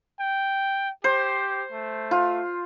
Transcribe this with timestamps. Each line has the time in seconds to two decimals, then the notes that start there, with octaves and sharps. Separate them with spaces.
0.20 G5
1.04 G4 C5
1.72 A3
2.11 F4